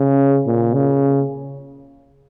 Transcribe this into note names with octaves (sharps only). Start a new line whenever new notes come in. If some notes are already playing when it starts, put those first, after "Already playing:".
Already playing: C#3
A#2
C#3